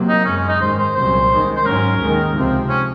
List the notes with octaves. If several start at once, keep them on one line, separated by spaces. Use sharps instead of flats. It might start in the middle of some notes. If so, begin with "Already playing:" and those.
Already playing: C3 F#3 A#3
D#4
F#2 C#3 G#3 C#4
C#4
D#4
G#2 D#3 G#3 C5
C5
C2 A#2 F#3 C#4 C5
D#2 D#3 G#3
C5
G#2 F#3 C#4 A#4
D#2 D#3 G#3
C#2 C3 F3 C4
C#4